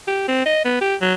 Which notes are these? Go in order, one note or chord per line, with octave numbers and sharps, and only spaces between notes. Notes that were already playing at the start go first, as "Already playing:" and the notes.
G4
C4
D#5
B3
G4
F#3